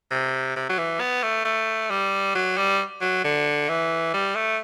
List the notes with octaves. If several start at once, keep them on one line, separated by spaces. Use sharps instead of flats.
C3
C3
F#3
E3
B3
A3
A3
G3
F#3
G3
F#3
D3
E3
G3
A3